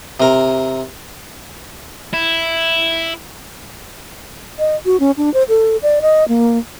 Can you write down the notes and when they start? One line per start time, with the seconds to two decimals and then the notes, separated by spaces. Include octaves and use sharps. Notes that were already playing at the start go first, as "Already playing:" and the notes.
0.20 C3 A#4
2.13 E4
4.59 D#5
4.86 F#4
5.00 C#4
5.17 D4
5.34 C5
5.49 A4
5.83 D5
6.02 D#5
6.28 A#3